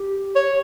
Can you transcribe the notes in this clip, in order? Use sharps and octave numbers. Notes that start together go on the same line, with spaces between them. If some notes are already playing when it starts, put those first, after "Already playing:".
Already playing: G4
C#5